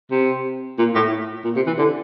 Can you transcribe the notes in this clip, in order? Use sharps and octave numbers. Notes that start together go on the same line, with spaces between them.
C3
A#2
A2
A#2
C3
E3
D3